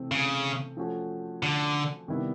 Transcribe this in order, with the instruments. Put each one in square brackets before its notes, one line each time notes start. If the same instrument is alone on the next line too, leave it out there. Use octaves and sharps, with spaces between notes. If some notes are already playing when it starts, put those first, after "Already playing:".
Already playing: [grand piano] C3 E3 A3 C4
[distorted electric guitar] C#3
[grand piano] F3 A3 C#4 F#4
[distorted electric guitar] D3
[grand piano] C3 D#3 G3 B3 E4